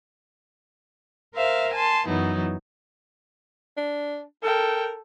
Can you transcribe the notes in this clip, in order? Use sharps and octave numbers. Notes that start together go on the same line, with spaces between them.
A#4 C5 E5 F5
G#5 A5 C6
F#2 E3 F#3 B3 D#4 E4
D4
A4 A#4 G5